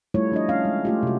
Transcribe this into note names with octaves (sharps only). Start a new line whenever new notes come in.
G3 A3 E4 F4 C#5
F3 D4 F4 D#5
C#4 F5
G#3
A3 F4 G4
C3 F#4